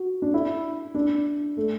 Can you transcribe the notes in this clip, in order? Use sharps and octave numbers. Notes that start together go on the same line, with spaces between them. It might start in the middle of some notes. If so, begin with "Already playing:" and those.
Already playing: F#4
D4
E4
D4
A3